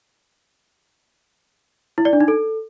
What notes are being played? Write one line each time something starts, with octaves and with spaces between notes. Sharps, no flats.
E4
D5
D4
D#4
A4